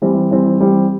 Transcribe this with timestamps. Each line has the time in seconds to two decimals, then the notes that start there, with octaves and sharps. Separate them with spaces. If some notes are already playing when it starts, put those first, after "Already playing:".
0.02 E3 G3 C4
0.31 E3 G3 C4
0.59 E3 G3 C4